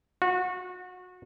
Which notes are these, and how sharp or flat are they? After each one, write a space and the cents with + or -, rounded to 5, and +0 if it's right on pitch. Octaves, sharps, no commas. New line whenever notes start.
F#4 -25